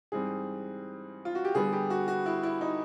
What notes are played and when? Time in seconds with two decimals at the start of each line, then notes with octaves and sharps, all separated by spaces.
0.12 G#2 E3 G3 C4 G#4
1.25 F4
1.35 F#4
1.45 G4
1.55 D3 G3 B3 G#4
1.73 G4
1.90 F#4
2.08 F#4
2.26 E4
2.43 E4
2.61 D#4